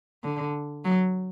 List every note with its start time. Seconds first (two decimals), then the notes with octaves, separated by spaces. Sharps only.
0.24 D3
0.85 F#3